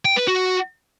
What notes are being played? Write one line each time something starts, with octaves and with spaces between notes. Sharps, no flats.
G5
B4
F#4